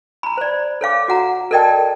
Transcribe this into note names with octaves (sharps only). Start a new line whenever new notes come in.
A#5 B5
C5 D5
A4 C#5 F5 D6
F#4 F#5 A#5
A4 A#4 D5 D#5 G5 A5